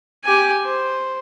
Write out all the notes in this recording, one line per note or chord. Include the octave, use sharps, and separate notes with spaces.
G4 G#5
C5